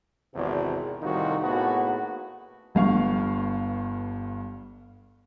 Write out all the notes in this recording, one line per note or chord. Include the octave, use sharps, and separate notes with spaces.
G#1 E2 C3
C2 A2 D#3 D#4 F4 F#4
A2 A#3 B3 D#4 F#4 G#4
G1 G2 F5 C#6